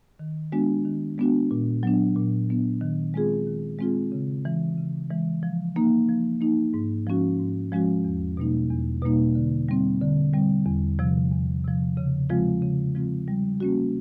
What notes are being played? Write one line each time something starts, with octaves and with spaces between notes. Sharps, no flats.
D#3
G#3 B3 D4 F#4
D#3
G#3 B3 D4 F#4
A#2
F#3 B3 D4
A#2
F#3 B3 D4
D#3
G#3 C4 F4 G#4
D#3
G#3 C4 F4 G#4
C#3
E3 G#3
C#3
E3 G#3
F3
A#3 D#4
F3
A#3 D#4
G#2
F3 G#3 C#4 F#4
G#2
F3 G#3 C#4 F#4
E2
B2 G3 A#3 D#4
E2
B2 G3 A#3 D#4
D3
G3 C4
D3
G3 C4
E2
C3 F3
E2
C3 F3
C#3
F3 G#3 C4 F4
C#3
F3 G#3 C4 F4
G3
A#3 C#4 F#4